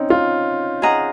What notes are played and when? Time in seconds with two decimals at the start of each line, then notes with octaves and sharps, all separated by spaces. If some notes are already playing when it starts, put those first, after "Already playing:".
Already playing: C4 C#4 D#4
0.10 F4
0.82 G#4 D#5 F#5 A#5